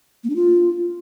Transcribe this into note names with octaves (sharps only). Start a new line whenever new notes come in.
A#3
D4
F4